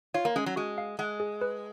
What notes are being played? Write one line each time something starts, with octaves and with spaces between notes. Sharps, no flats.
F4 C#5
A#3
G#3 C#4
F#3
G#3 F#4
F5
G#3 F#5
G#4
B4